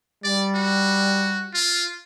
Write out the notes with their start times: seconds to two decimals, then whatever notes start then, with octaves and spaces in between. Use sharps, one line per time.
0.24 G3 D5
0.55 F#4
1.54 F4